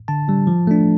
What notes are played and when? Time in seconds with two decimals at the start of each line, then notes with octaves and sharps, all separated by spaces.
0.08 D3 A5
0.28 G3 D4
0.47 F3
0.67 A3 D4